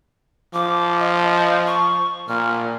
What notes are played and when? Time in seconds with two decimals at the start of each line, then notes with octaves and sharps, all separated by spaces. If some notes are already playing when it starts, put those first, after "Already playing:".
0.54 F3 D6
1.00 D#5
1.67 C#6
2.29 A#2 F6